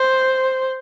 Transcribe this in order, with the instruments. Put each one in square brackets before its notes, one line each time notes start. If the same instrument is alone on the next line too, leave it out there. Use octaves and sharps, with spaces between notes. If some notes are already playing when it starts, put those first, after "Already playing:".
Already playing: [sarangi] C5